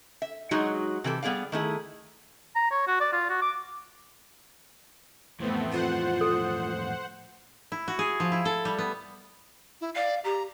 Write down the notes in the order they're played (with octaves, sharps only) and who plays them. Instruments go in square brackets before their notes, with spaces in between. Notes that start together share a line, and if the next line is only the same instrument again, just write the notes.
[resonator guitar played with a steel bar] E5
F#3 G#3 D#4 F#4 G#4
C3 E3 G4 A4
G3 B3 G#4 D5 F5
D#3 A3 E4 G#4
[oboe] A#5
C#5
F#4
D5
F4
F#4
D6
[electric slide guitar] F2 A2 E3 [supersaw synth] A3 B3 C4
[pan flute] F4 [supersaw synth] C5 F#5
[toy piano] A4
[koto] E4
F#4
G#4
F3
E4
A4
G3
B3
[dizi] E4
[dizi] D5 [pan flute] F5
[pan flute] G4 [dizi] A#5